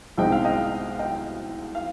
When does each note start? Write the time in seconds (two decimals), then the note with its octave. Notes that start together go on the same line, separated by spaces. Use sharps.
0.18 C2 B2 G#3 C4 D#4 G5
0.32 F5
0.45 D#5 G5
0.99 D#5 G5
1.75 F5